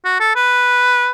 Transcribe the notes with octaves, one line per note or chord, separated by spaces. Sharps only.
F#4
A4
B4